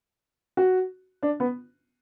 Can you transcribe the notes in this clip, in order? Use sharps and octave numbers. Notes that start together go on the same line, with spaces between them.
F#4
D4
B3